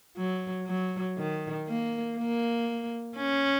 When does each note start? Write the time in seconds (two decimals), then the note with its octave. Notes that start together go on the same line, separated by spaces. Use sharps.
0.17 F#3
0.67 F#3
1.17 D#3
1.68 A#3
2.18 A#3
3.17 C#4